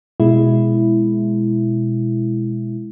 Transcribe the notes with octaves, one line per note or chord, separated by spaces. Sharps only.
B2 G#3 E4